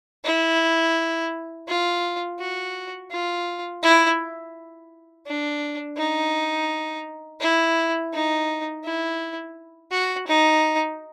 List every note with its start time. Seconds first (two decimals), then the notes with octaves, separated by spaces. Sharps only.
0.24 E4
1.68 F4
2.39 F#4
3.11 F4
3.82 E4
5.26 D4
5.97 D#4
7.40 E4
8.13 D#4
8.84 E4
9.91 F#4
10.27 D#4